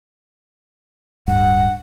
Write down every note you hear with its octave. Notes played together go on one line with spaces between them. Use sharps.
D1 G2 F#5